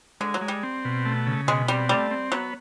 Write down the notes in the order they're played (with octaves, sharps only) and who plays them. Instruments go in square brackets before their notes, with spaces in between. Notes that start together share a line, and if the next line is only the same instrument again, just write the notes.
[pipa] D3 [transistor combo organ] G#3
[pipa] F#3
[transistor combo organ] G#3
[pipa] G3
[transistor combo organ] C4
B2
A3
C#3
[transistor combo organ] B2 [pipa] G#3
[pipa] G3 [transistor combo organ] C4
[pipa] G3 [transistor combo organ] A3
[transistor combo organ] C4
[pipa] F#3 [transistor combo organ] B3